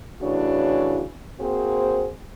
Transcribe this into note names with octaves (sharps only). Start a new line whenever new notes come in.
A2 C#3 E3 D4 F#4 C#5
A#3 C4 F#4 G#4 C5